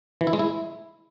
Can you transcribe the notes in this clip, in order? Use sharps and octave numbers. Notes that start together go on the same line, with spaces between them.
E3
E4
G#3
E4